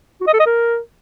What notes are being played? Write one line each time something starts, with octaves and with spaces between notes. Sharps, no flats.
F#4
D#5
A4
D#5
A#4